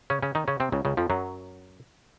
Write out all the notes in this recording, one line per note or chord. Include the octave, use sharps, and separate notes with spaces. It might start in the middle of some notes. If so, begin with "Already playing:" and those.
C#3 C#4
C#3 C#4
D#3 D#4
C#3 C#4
C3 C4
C#2 C#3
C#2 C#3
F2 F3
F#2 F#3